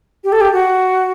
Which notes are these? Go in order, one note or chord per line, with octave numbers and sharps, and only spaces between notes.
G4
A4
G4
F#4